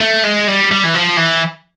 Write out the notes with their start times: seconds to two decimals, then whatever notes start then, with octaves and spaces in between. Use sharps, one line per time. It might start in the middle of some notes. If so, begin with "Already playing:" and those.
0.01 A3
0.24 G#3
0.48 G3
0.71 G3
0.83 E3
0.94 F3
1.17 E3